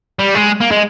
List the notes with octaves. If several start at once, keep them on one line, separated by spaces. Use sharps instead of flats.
G3
G#3
A#3
G#3